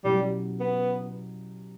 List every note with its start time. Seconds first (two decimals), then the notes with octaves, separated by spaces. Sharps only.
0.04 B2 F#3 G3 C#4 E4 G4
0.60 B3